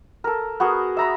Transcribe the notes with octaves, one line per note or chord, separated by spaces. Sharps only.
A4 A#4
B3 F#4 G#4 A#4
E5 A#5 B5